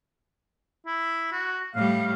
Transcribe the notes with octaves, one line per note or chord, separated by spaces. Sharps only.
E4
F#4
A2 G3 F5